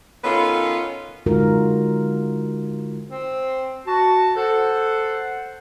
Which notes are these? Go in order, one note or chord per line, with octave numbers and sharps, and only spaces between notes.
D#3 B3 C#4 F4 A4 B4
D3 G#3 D#4 F4 F#4 A#4
C4
F#4 A5
A4 C5 F#5